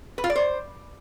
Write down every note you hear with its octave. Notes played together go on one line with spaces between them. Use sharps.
B4
F4
D5
C5